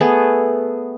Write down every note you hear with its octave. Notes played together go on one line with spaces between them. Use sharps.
A3 B3 G#4